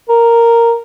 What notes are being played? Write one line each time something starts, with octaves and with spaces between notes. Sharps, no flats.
A#4